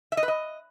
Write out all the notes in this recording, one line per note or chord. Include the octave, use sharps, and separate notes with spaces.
E5
D#5
B4
D#5